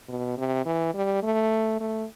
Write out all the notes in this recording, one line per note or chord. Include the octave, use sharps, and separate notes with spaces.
B2
C3
E3
G3
A3
A3